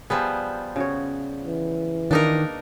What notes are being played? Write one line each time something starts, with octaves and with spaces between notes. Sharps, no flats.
F3 G3 B3 G#4
C#3 F#4 C#5
E3
D#3 A#3 D4 D#4 A#4 B4 D#5